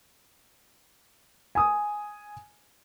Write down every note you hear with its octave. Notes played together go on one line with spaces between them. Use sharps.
G#5 D#6